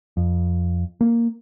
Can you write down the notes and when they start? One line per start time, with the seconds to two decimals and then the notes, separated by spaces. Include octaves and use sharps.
0.17 F2
1.01 A#3